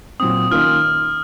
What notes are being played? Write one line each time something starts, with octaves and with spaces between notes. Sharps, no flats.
A#2 F#3 C4 D#6
D#3 A#3 C#4 F4 F6